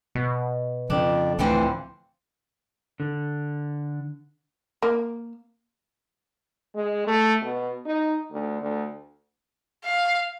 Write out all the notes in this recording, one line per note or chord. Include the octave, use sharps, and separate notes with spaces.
B2
F2 C#3 F3 D4
C#2 A2 D3 E3 F3 A3 C4
D3
A#3
G#3
A3
B2
D#4
D2
D2
F5